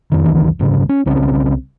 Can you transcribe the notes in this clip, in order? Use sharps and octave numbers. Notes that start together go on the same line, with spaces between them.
F2 D#3
F#1 C#2 D#3 E3
F#1 G#2 C#3
C#4
C2 C#3 C4 C#4